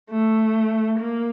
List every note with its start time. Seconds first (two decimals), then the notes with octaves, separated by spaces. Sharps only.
0.10 A3
0.99 A#3